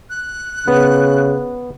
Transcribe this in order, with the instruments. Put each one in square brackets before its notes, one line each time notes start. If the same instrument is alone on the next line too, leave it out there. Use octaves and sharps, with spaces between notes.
[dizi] F#6
[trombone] C#3 [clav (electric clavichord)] B3